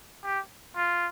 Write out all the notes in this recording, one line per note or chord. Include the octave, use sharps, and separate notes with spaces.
G4
F4